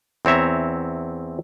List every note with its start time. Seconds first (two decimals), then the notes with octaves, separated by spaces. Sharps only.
0.25 E2 C4 C#5 E5 A#5